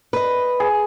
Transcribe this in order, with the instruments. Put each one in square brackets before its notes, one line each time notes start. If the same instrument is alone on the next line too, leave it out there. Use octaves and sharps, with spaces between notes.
[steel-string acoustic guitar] B4 D#5
[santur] G#4